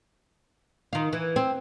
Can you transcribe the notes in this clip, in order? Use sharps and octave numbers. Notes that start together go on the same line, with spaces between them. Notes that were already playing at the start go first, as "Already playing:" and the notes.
D#3 F4
E3
C4